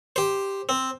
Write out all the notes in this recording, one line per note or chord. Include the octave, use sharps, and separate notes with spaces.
G4 C5
C4